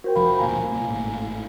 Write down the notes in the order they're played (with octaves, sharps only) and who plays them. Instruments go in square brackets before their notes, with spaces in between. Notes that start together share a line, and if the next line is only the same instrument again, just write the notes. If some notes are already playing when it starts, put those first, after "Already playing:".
[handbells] F#4 C5 G5 [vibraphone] A#4
[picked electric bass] F1 F3 [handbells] F5 [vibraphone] B5
[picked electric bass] E1 D2 A#2 [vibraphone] F5 G#5 [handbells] A#5
[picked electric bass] B2 A#3
G#1 A2